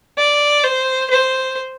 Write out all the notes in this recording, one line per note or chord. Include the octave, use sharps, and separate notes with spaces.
D5
C5
C5